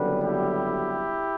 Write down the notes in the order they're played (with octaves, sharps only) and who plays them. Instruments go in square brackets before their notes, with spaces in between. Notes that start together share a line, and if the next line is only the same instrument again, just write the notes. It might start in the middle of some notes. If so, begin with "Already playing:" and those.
Already playing: [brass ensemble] F#1 F#2 D3 G3 B3 B4
E4 G4